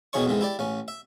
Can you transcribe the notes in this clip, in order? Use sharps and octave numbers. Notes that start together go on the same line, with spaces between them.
B2 D#3 E3 G#4 C#5 C#6
F2 G#2 D#3 E3
E4 G4 D5
A1 C#4
E5